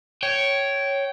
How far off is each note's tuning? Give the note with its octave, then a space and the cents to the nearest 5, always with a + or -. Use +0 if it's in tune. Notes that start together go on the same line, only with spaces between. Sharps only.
C#5 +0 G5 -15